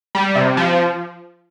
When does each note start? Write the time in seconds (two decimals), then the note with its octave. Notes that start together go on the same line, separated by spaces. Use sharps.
0.15 G3
0.35 C3
0.57 F3